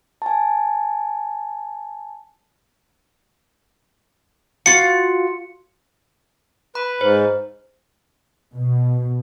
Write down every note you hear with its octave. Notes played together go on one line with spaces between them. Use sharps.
G#5 A5
F4 F#4 F5 C#7
B4 B5
G#2 C5
B2